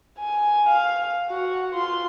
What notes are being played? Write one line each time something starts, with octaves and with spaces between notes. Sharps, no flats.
G#5
F5
F#4 F#5
F4 C6